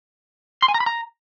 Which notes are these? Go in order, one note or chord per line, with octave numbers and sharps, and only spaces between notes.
C6
G#5
A#5
B5
A#5